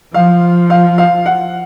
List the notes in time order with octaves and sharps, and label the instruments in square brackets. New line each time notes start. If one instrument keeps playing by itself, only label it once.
[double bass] F3 [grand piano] F5
[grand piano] F5
F5
F#5